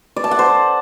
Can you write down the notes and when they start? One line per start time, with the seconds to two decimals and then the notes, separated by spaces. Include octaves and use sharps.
0.16 D5
0.24 A5
0.31 F#5
0.39 C5